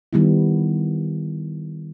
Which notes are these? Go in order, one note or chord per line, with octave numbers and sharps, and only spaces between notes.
D#3 G3 B3 E4